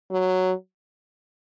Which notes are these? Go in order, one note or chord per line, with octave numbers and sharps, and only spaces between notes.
F#3